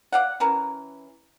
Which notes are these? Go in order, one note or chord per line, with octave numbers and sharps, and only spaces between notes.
D5 F5 F#5
E3 C#4 A#4